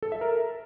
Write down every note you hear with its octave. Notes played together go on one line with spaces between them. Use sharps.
A4
E5
A#4